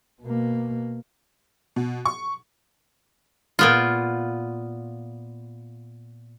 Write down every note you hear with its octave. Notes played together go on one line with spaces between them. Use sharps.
B2 A#3
B2
C#6
A#2 B3 F4